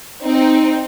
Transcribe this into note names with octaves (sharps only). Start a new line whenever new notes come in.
C4 D#4